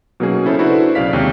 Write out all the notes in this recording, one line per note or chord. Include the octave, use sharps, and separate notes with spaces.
B2 F#3 A#3 C#4 D#4 G#4
C#3 E4 A4 C5 C#5
D4 E4 F#4 A4 B4 C5
B1 C#3 D5 F5 B6
D#2 C3 G#3 C#4